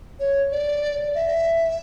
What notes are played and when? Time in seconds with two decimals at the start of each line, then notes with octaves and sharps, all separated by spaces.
0.20 C#5
0.51 D5
1.15 E5